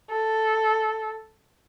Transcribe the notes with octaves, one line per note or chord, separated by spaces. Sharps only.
A4